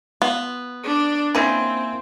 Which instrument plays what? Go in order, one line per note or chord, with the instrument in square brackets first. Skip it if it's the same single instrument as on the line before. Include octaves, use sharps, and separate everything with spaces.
[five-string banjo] B3 [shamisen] F4
[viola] D4 D5
[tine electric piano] A#3 E4 G#5 [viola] C4 [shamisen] C#4 D#4 B4